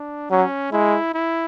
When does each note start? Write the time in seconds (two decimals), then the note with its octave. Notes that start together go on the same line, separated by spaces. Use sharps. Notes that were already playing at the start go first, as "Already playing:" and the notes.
Already playing: D4
0.31 F#3 C#4
0.72 G#3 E4
1.14 E4